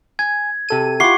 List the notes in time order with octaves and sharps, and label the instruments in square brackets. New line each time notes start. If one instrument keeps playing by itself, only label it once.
[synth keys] G#5 [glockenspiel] G#6
[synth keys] C3 A4 D#7
[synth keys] E4 F4 [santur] G4 F#5 C#6 [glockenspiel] C7 G7